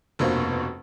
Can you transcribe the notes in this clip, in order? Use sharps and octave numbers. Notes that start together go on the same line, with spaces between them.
F1 G2 B2 A#3 C5